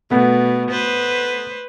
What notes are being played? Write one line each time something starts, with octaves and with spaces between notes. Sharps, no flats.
B2 A3 B3
B4 C5